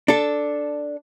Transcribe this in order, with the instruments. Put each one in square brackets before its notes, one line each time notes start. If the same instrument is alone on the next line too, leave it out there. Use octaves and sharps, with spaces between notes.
[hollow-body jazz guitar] D4 A4